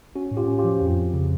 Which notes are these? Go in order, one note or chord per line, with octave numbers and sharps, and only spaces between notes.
C#4 F#4
A2
F4 G4
C#4
F4 G4
F3
F2
F2
C#3